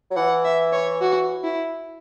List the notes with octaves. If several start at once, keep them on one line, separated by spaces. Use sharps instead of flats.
F#3
E3 F#5
E5
C#5
F#4
E4